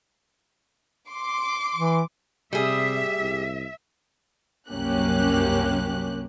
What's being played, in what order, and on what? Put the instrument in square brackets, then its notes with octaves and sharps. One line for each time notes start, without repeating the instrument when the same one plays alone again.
[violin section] C6 D6
[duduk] E3
[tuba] C3 [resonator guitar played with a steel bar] G3 G#4 [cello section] E5
[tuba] C2
[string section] C2 F#2 A#3 C#4 G4 F#6